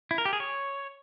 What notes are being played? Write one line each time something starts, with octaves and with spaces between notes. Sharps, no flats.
E4
A#4
G4
G#4
C#5